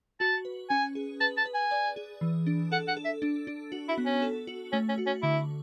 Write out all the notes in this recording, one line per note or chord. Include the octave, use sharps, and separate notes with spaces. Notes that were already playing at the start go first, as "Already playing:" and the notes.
F#4 A5
B4
C#4 G#5
G#4
B4 A5
A5
B4
G#5
D5
G#4
E3
D4
A4 F#5
F#5
A4
E5
D4
D4
F#4
E4
B3
C#4
A4
F#4
A3 C#4
C#4
F#4
C#4
D3 E4